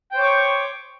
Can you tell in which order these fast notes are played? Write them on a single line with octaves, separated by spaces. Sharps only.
G5 C5 C#5 D6 C#6